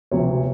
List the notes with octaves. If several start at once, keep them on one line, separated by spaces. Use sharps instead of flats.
E1 D2 C3 F3 C#5